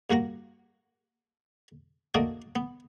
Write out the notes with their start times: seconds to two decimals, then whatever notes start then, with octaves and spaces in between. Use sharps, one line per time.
0.10 G2 A#3 F#4 F#5 A#5
2.14 A3 A#3 D4 F#4 D5 D#5
2.56 B3